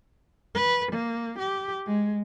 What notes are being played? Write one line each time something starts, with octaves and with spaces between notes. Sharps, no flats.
B4
A#3
G4
G#3